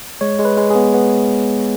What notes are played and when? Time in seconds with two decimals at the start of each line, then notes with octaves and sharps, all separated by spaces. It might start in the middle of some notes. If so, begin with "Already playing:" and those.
0.21 G#3 C#5
0.39 G#3
0.45 B4
0.57 G#3
0.70 G#4
0.76 B3
0.94 B3